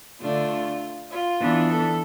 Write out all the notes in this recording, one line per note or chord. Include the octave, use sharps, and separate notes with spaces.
D3 A3 D4 F4
F4
E3 B3 D4
A4